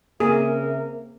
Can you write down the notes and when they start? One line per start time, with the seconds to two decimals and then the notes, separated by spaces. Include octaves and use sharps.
0.20 C#3 A#3 C4 G#4 A#4 E5